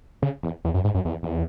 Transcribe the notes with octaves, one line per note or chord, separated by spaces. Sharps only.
C#3
E2
E2
F#2
G#2
F#2
E2
E2